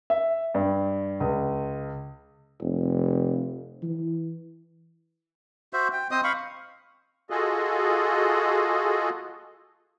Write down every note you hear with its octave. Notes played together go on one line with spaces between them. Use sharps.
E5
G2
C#2
F1
E3
F#4 C5 E5
G5
C4 C5 D#5 D#6
F5 B5 C#6
F4 F#4 G#4 A4 D#5